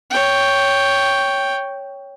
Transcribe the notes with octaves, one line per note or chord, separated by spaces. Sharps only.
C#5 G5